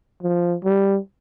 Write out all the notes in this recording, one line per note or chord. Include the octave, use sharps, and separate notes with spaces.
F3
G3